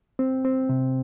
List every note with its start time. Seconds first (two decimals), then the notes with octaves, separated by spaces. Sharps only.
0.19 C4
0.45 C4
0.69 C3